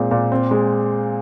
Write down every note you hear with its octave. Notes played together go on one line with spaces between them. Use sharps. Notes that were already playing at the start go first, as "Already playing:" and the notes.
Already playing: A#2 G#3 C4
A#2
C4
G#3